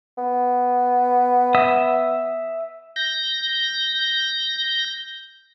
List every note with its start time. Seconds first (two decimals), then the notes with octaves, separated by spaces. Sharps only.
0.18 B3
1.55 E5 D#6
2.96 G6 A#6